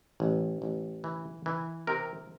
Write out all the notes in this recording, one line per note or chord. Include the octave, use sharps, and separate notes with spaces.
A1
A1
E3
E3
C3 A#4